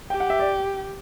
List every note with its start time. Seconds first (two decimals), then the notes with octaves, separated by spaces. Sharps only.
0.10 G4 G5
0.20 F#5
0.30 E5
0.40 D5